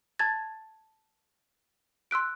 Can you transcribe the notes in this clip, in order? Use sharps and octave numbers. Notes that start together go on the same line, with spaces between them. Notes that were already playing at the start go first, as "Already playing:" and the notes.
A5 G#6 A6
C6 E6 F#6 D7